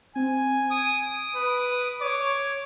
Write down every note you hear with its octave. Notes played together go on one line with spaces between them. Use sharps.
C4 G#5
D#6 D7
B4
C#5 D6